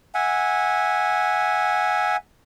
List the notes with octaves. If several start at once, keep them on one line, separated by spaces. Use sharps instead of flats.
E5 F#5 G#5